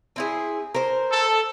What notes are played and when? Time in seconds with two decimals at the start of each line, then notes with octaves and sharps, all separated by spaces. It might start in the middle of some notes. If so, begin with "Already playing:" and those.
0.16 C4 E4 G#4
0.75 A#4 C5
1.12 A4